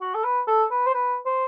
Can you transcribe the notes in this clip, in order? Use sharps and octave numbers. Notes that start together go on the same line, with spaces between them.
F#4
A4
B4
A4
B4
C5
B4
C5